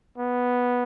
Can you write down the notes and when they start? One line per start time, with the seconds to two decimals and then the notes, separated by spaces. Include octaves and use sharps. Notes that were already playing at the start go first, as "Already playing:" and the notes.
0.18 B3